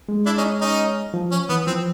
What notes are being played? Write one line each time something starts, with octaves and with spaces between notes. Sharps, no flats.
G#3
D4 E4
C#4 D#4
C#4 D#4
F3
C#4
E3 B3
F3 C4